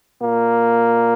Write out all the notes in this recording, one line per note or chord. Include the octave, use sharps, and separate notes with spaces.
A#2 A#3